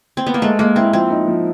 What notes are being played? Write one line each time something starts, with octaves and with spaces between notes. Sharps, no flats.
C4
B3
A#3
G#3 A3
G#3 A#3
C4 E4
F3 C4
D#4
F3